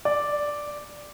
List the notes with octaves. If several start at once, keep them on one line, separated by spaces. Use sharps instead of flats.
D5